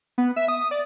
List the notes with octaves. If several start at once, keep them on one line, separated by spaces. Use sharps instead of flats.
B3
E5
D#6
D5